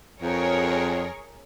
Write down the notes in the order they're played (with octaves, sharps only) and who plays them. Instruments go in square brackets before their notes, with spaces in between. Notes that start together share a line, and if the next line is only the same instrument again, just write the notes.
[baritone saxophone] F2 [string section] G#4 A#4 C#5